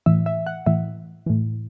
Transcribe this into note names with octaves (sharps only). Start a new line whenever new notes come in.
A2 E3 E5
E5
F#5
A2 E3 E5
A2 E3